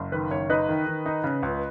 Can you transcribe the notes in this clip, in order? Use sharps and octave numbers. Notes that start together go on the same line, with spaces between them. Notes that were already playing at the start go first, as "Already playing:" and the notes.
Already playing: F#1
D#3 B4
F#1 C#5
D#4 B4 D#5
D#3
D#3
D#4
C#3
C#2